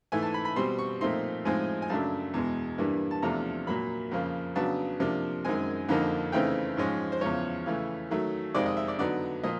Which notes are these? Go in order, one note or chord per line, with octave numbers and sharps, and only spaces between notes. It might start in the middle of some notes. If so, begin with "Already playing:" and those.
G#2 E3 A3 G#5
A5
B5
B5
B2 G3 C4 C6
C#6
A#2 F3 A3 C4 D#4 C6
A2 F3 G#3 C4 D#4 G#5
G#5
F#2 C#3 F#3 A3 D4 A5
E2 B2 G#3
G2 E3 G3 A#3 D4
A5
E2 C3 F3 A3 D4 A#5
A#2 F#3 A#3 B5
F2 C#3 F3 A#3
C#3 F#3 B3 D4 A5
C3 F3 A#3 D4
F#2 D#3 G#3 C4 G#5
F2 D3 F3 A#3 D#4
C#3 E3 A3 C4 D#4 G5
G#2 F3 G#3 C#4
C5
E2 C#3 F3 C#5
C#3 E3 A3
D#3 F#3 A3
F2 C3 D#3 G#3 C4 D5
D#5
E5
D5
D3 F#3 B3 D#4 D5
A#2 F3 D#5